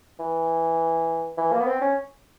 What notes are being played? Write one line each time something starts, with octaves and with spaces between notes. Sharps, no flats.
E3
E3
A#3
B3
C4
C#4